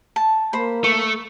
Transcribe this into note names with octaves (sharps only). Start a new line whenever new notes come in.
A5
A#3 C5 B5
A3 C#6